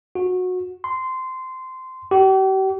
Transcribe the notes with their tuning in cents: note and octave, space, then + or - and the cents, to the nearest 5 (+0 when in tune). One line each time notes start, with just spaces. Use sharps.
F#4 -20
C6 -15
G4 -40